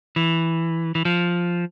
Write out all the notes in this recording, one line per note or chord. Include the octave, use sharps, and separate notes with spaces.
E3
E3
F3